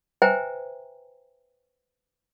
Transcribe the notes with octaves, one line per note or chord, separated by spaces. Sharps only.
B4 C5 E5 G5 G#5 A#5